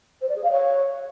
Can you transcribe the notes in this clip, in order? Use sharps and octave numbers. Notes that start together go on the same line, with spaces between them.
C5
D5
G#4
F5
C#5